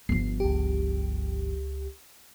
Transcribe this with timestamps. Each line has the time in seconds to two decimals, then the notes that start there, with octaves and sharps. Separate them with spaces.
0.09 G1 F3 C7
0.40 C#2 G4